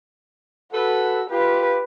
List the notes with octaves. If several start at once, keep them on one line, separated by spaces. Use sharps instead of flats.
F#4 A4 B4
F4 G4 B4